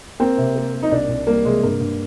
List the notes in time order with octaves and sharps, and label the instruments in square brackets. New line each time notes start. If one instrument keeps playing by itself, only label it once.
[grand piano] A#3 [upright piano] C4
[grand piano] C3
A#3
A#3
[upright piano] D#4
[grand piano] C2 [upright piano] D4
[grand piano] C2
[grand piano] G3 [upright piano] A#3
[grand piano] C3 [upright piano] G#3
[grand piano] G2 [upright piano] A#3
[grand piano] G2